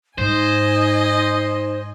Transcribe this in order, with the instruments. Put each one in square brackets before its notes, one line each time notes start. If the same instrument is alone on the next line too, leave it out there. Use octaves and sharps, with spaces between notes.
[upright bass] G#2 [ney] D#4 [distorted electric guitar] C5 [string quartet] D#5 G#5